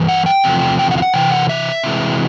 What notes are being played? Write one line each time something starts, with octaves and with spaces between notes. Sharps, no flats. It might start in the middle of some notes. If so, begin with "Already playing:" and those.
Already playing: G2 E3
F#5
G5
E2 C3 F3 A3
G5
F#5
F5
F#5
C3 E3 G5
F#5
E5
C3 E3 G#3